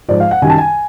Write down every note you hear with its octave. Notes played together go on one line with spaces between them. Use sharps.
G#2 F3 D5
F5
F#5
F#2 D#3 G3 G#5
A5
G#5